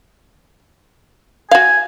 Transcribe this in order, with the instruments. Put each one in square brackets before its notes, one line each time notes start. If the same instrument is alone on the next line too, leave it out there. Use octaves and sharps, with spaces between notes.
[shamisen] F#4 F5 [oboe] G#5